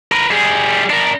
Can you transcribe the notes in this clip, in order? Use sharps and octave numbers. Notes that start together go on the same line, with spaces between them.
A#4 B4
G3 G#4
D4 A#4